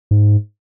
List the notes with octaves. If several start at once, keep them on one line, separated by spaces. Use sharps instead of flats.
G#2